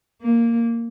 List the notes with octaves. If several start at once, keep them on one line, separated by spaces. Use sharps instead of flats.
A#3